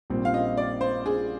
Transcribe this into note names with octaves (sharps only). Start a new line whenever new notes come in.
A#1 A#2 G3 C4
F5
D#5
D5
C5
G#4